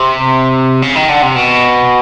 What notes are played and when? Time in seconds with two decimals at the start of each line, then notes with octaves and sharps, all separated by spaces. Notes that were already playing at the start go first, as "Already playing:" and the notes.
Already playing: C3
0.83 C#3
0.96 D#3
1.10 D3
1.23 C3
1.36 B2